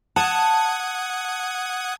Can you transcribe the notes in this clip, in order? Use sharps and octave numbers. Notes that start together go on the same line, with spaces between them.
F#5 A5 D#6 G#6